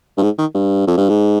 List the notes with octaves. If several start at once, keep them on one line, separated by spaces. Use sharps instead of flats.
G2
G#2
D#3
G2
F2
G2
G#2